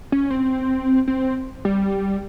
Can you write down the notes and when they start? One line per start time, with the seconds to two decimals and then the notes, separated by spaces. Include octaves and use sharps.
0.12 C#4
0.30 C4
1.08 C4
1.65 G3